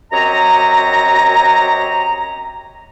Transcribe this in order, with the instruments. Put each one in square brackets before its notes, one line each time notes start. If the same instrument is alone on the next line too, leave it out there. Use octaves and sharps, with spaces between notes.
[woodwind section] F#2 C4 G4 C#5 D#5 A#5